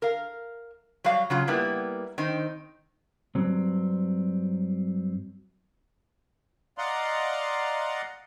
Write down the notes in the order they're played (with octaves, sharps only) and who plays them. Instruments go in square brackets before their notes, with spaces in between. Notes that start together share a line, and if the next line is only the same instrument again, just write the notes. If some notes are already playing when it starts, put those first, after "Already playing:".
[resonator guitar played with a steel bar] A#4 F5
F#3 G3 F#4 F5
C#3 F#3 F4
G3 A#3 B3 E4
D#3 C4 D#4
[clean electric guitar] G2 F#3 C4
[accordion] D5 D#5 F5 F#5 A#5 C6